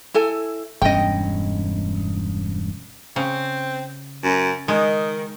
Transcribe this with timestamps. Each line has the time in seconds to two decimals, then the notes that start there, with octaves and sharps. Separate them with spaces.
0.14 E4 A4 G#5
0.82 E1 G2 C#4 D#5 G5
3.16 C#3 C4
4.24 F#2
4.68 D#3 G#3